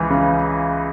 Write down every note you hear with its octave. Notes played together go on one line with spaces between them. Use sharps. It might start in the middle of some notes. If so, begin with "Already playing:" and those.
Already playing: C#2 E3
C#3